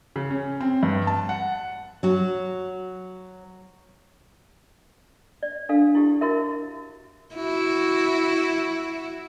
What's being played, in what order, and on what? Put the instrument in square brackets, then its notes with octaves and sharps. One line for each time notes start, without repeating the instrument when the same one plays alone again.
[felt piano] C#3
C#4
C4
G2
A5
F#5
[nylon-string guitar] F#3 F#4
[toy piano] D5
D4 A4 F5
E4 G4
E4 F#4 A#4 E5
[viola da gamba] E4 F#4